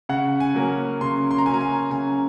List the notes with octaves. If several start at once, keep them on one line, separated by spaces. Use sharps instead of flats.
C#3 F#5
G#5
F#3 A#3 C#4
C#3 C6
C6
A#5
F#3 A#3 C#4 G#5
A#5
G#5
C#3 G#5